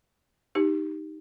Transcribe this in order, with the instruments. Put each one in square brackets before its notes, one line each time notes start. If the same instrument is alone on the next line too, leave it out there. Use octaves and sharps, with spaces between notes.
[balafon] D#4 G4